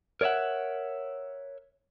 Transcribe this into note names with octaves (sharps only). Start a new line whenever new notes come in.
A#4 C#5 D5 E5 F#5